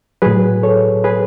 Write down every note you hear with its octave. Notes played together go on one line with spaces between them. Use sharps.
A2 F#3 G#4 B4
A4 C#5
G#4 B4